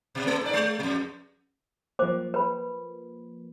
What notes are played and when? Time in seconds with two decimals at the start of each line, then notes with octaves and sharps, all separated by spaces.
0.15 B2
0.27 A3 B3 A4
0.42 G#2 D5
0.53 G#3
0.79 F2 B2
1.99 F3 A#3 C5 D6
2.34 B4 B5